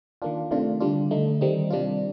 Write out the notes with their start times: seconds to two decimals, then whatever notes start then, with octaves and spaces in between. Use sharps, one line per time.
0.22 D#3 A#3 D4 F4
0.51 C3 D#3 A3 D4 F4
0.80 D3 G3 D4 F4
1.11 D3 A3 D#4
1.41 D#3 G3 C4 D#4
1.70 C3 G3 D4 F4